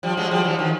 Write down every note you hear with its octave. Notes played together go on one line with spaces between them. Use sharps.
F3 G3
F#3 G#3
F3 G3
E3 F#3
D#3 F3